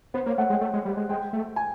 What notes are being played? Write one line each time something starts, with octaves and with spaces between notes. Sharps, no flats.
B3 C5
A#3 C#5
A3 F#5
G#3 G5
A3
G#3
G3
G#3
G#3 G5
A3
G#5